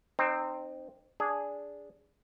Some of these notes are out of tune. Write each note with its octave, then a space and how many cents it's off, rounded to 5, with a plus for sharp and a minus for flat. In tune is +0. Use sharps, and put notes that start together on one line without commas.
C4 +0 D#4 -30
D4 -10 G#4 -5